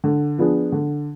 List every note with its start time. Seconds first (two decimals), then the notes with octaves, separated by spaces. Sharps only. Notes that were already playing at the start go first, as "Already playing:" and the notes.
0.04 D3
0.38 F3 B3 D4 G#4
0.72 D3